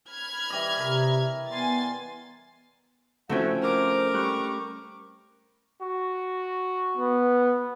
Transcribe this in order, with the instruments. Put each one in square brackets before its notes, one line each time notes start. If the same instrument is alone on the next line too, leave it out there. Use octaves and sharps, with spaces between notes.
[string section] B5 F6 G#6
[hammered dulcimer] E3 G3 D#5
[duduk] C3 [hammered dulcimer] A#4
[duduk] B3 [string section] G#5 C6 A6
[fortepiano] F3 E4 F#4 [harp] A3 C4 C#4 [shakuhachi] F#5
[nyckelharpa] A#4 D6 [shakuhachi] C5
[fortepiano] G3 F#6 [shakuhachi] C#6
[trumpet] F#4
[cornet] B3